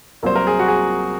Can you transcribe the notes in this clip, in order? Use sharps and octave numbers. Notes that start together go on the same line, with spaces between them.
C2 C3 F#3 A#3 C5
A#4
G#4
F#4
G#4